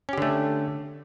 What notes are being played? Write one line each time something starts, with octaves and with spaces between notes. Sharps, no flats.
D3 A3 C#4 G4